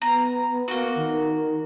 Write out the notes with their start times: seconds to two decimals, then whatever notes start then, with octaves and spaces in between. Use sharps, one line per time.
0.02 B3 A#5
0.68 A#3 F#4
0.95 D#3